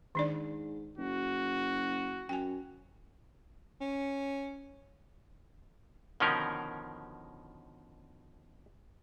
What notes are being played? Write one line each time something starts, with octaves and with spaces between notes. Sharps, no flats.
G#2 D#3 D4 D5
F#1 F#4
F#2 G5 G#5
C#4
B2 D3 D#3 F3 C#4 A#4